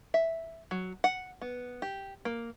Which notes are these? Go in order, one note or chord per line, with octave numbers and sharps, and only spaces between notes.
E5
F#3
F#5
B3
G4
A#3